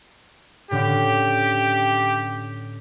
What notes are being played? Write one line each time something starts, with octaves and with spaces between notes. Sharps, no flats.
A2 D3 C#4 G4